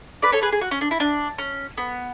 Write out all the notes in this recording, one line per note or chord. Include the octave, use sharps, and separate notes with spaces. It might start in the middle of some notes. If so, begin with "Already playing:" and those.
B4 D5
A4 C#5
G#4 B4
G#4
F#4
C#4
D4
E4
D4
C#4
B3